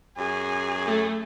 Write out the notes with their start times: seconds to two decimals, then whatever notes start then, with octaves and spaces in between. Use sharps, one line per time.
0.18 F#2 G#4
0.86 A3